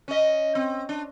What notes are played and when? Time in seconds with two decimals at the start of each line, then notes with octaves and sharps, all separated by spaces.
0.08 C#4 D#5
0.55 C4
0.89 D4